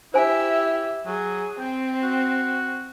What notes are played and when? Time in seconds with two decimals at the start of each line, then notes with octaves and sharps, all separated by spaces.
0.14 E4 G4 C5 E5 G#5
1.06 F#3 G#4
1.60 C4 G5
2.03 F#4